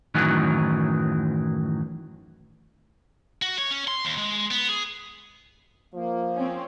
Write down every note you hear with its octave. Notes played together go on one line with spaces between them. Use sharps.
F#2 A2 D#3 E3 F#3
F#4
C#5
C#4
C6
D#2
G#3
B3
G#4
F3 A#3
C4 C#4